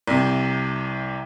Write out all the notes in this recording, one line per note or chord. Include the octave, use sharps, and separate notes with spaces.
C2 C3